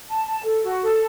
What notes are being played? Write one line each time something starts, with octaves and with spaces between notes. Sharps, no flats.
A5
A5
A4
F#4
A4